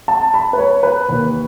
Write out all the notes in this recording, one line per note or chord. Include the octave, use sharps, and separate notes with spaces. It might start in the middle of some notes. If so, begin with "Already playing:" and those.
A5
B5
B4
C#5
B4
D#2 D#3